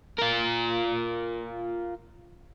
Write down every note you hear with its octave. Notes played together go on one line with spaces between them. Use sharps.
F4 A#4